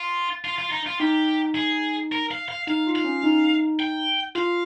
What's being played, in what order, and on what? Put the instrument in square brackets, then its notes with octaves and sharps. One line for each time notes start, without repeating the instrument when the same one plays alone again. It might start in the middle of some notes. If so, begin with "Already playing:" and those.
Already playing: [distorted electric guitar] F4
F4
F4
D#4
F4
[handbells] D#4 [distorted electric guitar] G4
[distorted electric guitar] G#4
A#4
F5
F5
[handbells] D#4 [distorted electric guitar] F5
[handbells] F4
[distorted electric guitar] F5
[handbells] C#4
D#4
[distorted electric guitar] G5
[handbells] F4 [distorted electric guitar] F5